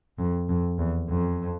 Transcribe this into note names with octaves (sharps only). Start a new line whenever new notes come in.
F2
F2
E2
F2